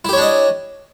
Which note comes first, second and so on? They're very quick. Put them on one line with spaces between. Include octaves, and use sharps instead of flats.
E4 G4 C#5 D4 D#5